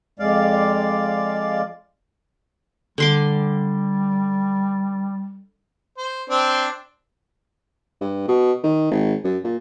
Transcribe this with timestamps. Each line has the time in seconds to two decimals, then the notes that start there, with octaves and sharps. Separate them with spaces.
0.19 F2 G#3 D5 F5
2.98 D3 G3 C6 D6
5.98 C5
6.30 C4 D4 C5
8.01 G2
8.28 B2
8.64 D#3
8.91 G#1
9.24 F#2
9.44 A#2